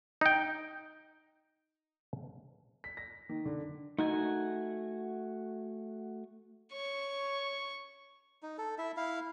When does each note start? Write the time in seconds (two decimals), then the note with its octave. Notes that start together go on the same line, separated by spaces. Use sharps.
0.21 D#4 G5
2.84 B6
2.97 A#6
3.29 D#3
3.45 D3
3.99 A3 D#4 F#4 G#5
6.73 C#5 C#6
8.43 D#4
8.58 A4
8.78 E4 E5
8.97 E4 F5